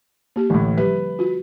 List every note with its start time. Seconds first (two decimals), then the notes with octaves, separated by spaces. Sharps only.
0.36 A#3 G4
0.50 A1 A2 D3
0.77 F3 G3 G4 B4
1.19 F4 F#4